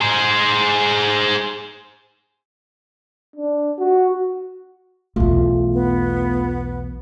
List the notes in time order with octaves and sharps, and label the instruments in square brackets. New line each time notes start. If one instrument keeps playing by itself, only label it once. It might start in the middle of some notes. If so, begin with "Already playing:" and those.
[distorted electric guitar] G#4 C5
[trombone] D4
F#4
[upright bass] B1 E2 [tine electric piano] A3 F4
[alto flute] B3